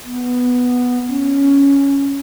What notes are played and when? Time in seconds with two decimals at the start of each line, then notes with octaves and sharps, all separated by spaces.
0.04 B3
1.08 C#4